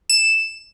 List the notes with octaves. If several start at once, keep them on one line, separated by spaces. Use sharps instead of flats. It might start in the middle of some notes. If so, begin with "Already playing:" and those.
E7